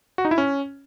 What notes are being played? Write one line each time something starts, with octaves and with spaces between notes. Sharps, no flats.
F#4
D#4
E4
C#4